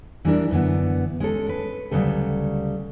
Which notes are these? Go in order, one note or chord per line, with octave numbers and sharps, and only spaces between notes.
E3 G3 D4 A#4
F#2 D3 E3 B3
G#3 C#4 A4
B4
D2 A#2 C#3 F#3 G3 A4